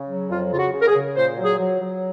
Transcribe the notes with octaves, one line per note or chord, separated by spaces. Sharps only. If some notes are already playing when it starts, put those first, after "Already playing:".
Already playing: C#3
F#3
F2 F4
C#3 F4
F#4
C#3
A#4
G#4
C#3
A#2 C5
F#3
G#4
F#3
F#3